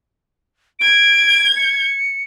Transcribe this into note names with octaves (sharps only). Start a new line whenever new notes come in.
G#6 D7
C#7